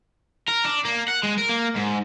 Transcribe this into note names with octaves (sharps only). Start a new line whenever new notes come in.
A#4
D4
A#3
F#5
G#3
A#4
A#3
G#2